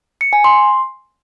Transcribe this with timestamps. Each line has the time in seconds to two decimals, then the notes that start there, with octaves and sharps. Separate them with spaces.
0.21 C#7
0.33 G#5
0.44 C6